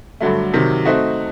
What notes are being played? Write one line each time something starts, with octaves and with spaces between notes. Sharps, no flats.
G2 D3 F#3 A3
C3 D#3 F#3
A3 C4 D#4 F#4